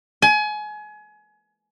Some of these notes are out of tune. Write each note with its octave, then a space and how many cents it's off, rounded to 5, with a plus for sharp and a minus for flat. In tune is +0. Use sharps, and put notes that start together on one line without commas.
G#5 +30